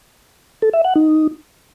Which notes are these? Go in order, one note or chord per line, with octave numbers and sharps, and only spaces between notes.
A4
E5
F#5
D#4